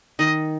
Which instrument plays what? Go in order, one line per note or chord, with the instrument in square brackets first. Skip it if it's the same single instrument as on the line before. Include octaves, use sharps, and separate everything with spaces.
[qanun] D#3 [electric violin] D#5